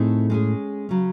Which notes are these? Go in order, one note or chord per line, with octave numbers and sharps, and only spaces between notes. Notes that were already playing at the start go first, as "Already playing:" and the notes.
Already playing: A2 A3 C4 D#4 G#4
G#3 C#4 G#4
C#3 F#3 C#4